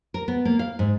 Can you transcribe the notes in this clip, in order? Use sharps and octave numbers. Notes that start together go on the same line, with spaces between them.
A#4
B3
A#3
F5
G#2